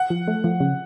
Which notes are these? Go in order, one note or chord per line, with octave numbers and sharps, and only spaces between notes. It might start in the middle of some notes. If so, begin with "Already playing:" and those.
Already playing: F#5
F3
A3
F3
C#3